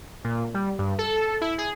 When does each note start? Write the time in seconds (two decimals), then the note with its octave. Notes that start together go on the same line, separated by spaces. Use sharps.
0.24 A#2
0.54 G3
0.79 G2
0.98 A4
1.41 E4
1.58 G#4